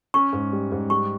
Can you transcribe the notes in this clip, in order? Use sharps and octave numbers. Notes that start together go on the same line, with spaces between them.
C#4 C#6
G#2
G3
G#2
G3 C#6